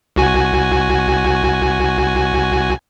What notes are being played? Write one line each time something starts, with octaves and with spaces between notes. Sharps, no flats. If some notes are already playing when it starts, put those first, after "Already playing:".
C2 F#4 G#5